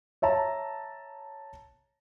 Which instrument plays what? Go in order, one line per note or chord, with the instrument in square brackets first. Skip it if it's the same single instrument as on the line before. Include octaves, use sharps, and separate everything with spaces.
[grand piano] C#5 E5 A5 A#5